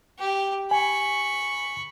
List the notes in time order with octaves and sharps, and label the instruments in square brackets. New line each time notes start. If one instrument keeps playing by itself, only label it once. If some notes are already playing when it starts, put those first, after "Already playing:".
[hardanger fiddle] G4
[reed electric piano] G#5 [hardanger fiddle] B5 C#6